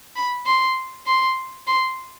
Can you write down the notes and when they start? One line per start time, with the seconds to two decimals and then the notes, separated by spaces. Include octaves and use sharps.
0.16 B5
0.46 C6
1.06 C6
1.67 C6